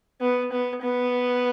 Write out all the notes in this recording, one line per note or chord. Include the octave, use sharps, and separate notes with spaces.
B3
B3
B3